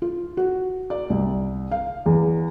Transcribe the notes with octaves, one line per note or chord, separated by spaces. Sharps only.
F4
F#4
D5
C2
F5
E2